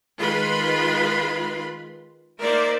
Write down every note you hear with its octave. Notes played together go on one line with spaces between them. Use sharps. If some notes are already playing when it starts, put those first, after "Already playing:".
D#3 G#3 F4 B4 B5 C6
A#3 D#4 A#4 C5 D5 E5